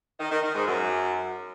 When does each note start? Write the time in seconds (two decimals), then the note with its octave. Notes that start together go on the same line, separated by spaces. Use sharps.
0.19 D#3
0.31 D#3
0.43 D#3
0.54 G#2
0.66 F#2